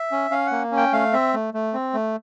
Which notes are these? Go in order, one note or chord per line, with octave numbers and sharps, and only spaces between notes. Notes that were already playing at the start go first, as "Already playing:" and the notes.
Already playing: E5
C#4
C#4 F5
A#3 F#5
C#4
G5
A3 F5
C4 E5
A3
A3
C4
A3